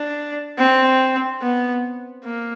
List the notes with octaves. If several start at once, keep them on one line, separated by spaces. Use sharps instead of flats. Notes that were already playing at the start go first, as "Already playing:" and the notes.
Already playing: D4
C4
B3
A#3